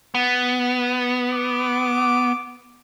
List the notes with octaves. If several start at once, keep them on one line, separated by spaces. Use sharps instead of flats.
B3
D6